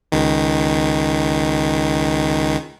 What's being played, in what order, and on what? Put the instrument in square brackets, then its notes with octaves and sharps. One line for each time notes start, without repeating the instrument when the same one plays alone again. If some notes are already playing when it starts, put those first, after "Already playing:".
[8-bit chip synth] C#2 D#3